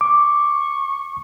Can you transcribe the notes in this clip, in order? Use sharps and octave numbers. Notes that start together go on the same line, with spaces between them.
C#6 D6